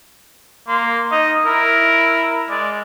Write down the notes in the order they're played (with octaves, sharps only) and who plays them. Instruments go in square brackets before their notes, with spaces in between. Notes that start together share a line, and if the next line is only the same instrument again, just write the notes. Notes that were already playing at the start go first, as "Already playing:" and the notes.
[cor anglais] A#3 [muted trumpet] C6
[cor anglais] D#4 [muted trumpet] D#5
[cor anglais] E4 [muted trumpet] A#4
[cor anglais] G#3 [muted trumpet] D5